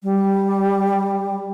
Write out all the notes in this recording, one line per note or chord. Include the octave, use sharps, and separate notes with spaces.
G3